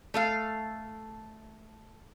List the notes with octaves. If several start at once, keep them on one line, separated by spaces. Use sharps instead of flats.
A3 A4 F5